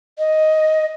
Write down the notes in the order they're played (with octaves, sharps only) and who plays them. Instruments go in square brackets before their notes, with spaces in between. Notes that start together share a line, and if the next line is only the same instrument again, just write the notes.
[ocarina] D#5